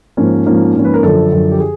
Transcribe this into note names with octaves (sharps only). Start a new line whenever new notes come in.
G#2 F3 A#3 C#4
G#2 F3 A#3 C#4
G#2 F3 A#3 C#4
B4
A#4
F#2 D3 F3 A4
F#2 D3 F3
G4
G#4